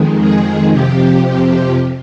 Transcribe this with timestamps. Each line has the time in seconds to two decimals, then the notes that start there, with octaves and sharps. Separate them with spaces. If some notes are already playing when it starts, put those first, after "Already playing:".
Already playing: F2 D#3 G#3
0.19 G#4
0.72 F2 C3 F3 G4
1.25 G4